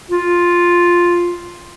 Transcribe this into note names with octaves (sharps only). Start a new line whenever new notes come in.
F4